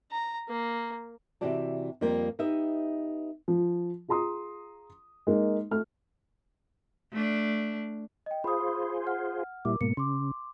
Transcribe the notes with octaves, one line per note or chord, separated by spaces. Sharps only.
A#5
A#3
C3 E3 F#4 G4 D5 A5
F2 G3 A#3 F4 G5
B3 D#4 G4 D#5 E5
F3
F4 G#4 A#5 C6 D#6
G#3 A#3 D#4
A3 F6
A3 D4
D#5 G5
F4 G#4 C5 B5 D#6
F#5 F6
A#2 G3 E4 A#4 D6
G#2 B2 A#3 C#7
C#3 C6 D6